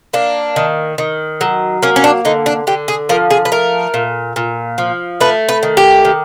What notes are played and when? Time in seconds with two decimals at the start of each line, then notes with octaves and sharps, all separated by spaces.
0.13 A#3 D4
0.56 D#3
0.98 D#3
1.41 F#3
1.83 A#3 C#4
1.96 C#4
2.04 D4
2.25 D3 D#4
2.46 D4
2.67 D3 G4
2.88 G#4
3.09 F3 A#4
3.30 G#4
3.45 B4
3.52 A3 A#4
3.94 A#2
4.36 A#2
4.78 F3
5.21 A3 B4
5.49 B4
5.63 D#3
5.77 G4
6.05 D#3